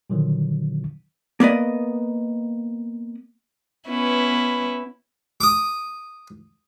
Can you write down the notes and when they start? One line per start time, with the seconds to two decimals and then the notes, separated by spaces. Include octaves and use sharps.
0.10 A#2 D3 D#3 F3 F#3
1.40 A#3 B3 D5 D#5
3.88 B3 C#4 E4 B4
5.41 D6 D#6